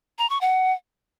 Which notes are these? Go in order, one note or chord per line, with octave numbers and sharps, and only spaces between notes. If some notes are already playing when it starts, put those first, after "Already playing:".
A#5
C#6
F#5